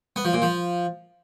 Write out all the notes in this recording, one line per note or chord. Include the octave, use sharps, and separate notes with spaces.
B3
F3
A#2
F3